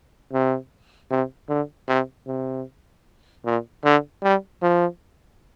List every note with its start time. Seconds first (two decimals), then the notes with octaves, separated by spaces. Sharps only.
0.33 C3
1.11 C3
1.49 D3
1.89 C3
2.27 C3
3.45 A#2
3.84 D3
4.23 G3
4.62 F3